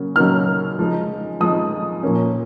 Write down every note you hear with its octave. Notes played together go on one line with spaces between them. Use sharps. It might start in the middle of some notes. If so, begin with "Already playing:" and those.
Already playing: C#3 F#3 A#3
C#3 F#3 A#3 D#4 F6
F3 G#3 D#4
F3 G#3 D#4 D#6
A#2 F3 A#3 C#4